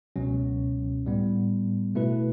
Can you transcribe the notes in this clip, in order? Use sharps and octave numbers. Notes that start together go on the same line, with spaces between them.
C#2 B2 F#3 C#4
A2 G3 B3
B2 A3 E4 B4